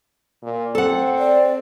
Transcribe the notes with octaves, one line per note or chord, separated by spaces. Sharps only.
A#2
C4 A4 F#5
D5